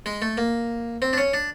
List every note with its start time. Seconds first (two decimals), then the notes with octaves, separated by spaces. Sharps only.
0.06 G#3
0.22 A3
0.37 A#3
1.02 C4
1.13 D4
1.18 C#4
1.34 D4